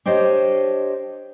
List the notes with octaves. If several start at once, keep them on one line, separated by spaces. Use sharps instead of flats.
D4 G4 C5 C#5 D#5